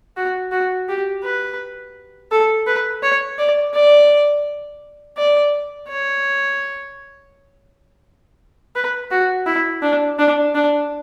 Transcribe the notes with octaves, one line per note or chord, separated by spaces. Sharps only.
F#4
F#4
G4
B4
A4
B4
C#5
D5
D5
D5
C#5
B4
F#4
E4
D4
D4
D4